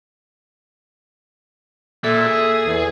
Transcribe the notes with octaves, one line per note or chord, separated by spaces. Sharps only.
A#2 A4 E5
G#4
E2